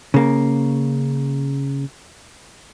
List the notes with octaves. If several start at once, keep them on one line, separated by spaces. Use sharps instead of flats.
C#3 A#3